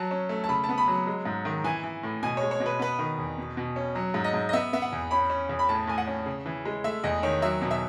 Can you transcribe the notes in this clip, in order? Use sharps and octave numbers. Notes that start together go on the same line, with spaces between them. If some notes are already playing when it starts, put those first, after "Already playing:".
Already playing: F#3 A5
C#4
A3
A5
C#3 B5
A5
B3
B5
F#3
G#3
G#2
D#3
E3 G#5
E3
A2
B2 G#5
G#3 C#5
C#5
B2
B4
B3 B4
D#3
E2
B2
B2
C#4
F#3
G#2
D#5
G#2
D#5
B3 E5
B3 E5
F#5
E2
C#4 B5
C#4
E2
B5
A2 A5
A2 G#5
F#5
C#4
C#3
E3
G#3
A3 E5
E2 D#5
D#3 C#5
F#3 E5
B2
E5